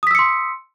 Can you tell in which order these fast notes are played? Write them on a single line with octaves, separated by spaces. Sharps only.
D#6 B6 E6 C#7 C6